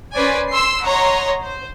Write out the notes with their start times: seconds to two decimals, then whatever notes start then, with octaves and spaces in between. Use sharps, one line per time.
0.13 C#4 B4 C5 D5 G#5
0.50 C6 E6 C7
0.84 C#5 D#5 F#5 A#5 C6
1.42 C5